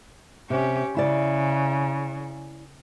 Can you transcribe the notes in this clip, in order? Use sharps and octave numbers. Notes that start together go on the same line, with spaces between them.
C3 C#4 G4
C#3 E4 D5